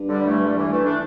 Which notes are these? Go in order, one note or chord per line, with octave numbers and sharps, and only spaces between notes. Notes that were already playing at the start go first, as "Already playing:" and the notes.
Already playing: G2
D3 G3
E3 A3
D3 G3
E3
E3 A3
A3 D4